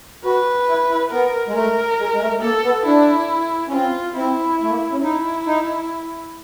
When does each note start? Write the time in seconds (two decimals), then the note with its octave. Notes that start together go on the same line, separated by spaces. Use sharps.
0.25 F#4 B4
0.68 E4
0.90 E4
1.11 B3 A#4
1.48 G#3
1.55 A3 A#4
1.99 G#3
2.14 G#3
2.21 A3
2.42 A#3 A4
2.63 B3
2.85 D4 E4
3.68 C#4
3.72 C4 F4
4.16 C4 E4
4.62 A3
4.70 A#3
4.92 C#4
5.03 D#4 E4
5.46 D#4